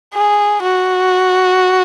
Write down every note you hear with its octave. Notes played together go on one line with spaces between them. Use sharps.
G#4
F#4